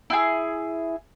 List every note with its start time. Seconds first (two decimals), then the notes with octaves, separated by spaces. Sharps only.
0.10 E4 G4 G#4